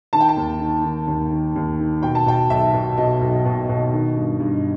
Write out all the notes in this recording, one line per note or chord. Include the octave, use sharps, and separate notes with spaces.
D#3 A5
G5
A5
D#2
D#3
D#3
D#2
D#3
D#2
D#3
B2 G5
A5
B2 G5
B1 E5
B2
B2 D#5
B1
B2
B2
D#3
G2
G2